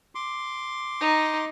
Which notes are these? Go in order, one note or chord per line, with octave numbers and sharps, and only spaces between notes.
C6 D6
D#4